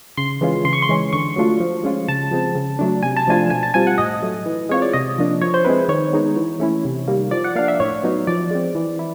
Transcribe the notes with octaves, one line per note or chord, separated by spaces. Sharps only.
C#3 C6
E3 G#3 C#4 F4
C#3 C6
C#6
C6
E3 G#3 C#4
D3 C#6
F#3 A3 D4 F4
F3
G#3 C#4 F4
C#3 A5
F3 G#3 C4
C#3
F#3 A3 D4
C3 G#5
A5
F3 A3 D4 F4 G#5
B2 G#5
A5
G3 C4 F4 G#5
F#5
A2 D#5
F#3 A3
E3
G#3 C4 F4 C#5
D5
C3 D#5
F3 A#3 D4
F3 C#5
C5
G#3 C4 E4 B4
D#3 C#5
G#3 B3 D#4
E3
A3 C#4 E4
C3
D#3 G3 A#3
F3 D5
F#5
A#3 D4 F5
E5
A2 C#5
F#3 B3 D#4
F3 D5
G#3 C4
E3
E4